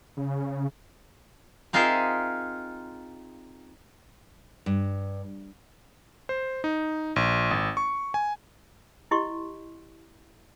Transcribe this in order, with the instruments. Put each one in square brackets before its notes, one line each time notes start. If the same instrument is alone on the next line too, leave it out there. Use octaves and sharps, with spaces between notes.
[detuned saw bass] C#3
[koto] C4 D#4 F4 G#4 A#4 E5
[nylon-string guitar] G2
[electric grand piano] C5
D#4
A#1
G#1
C#6
G#5
[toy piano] E4 G4 D#5 C6 C#6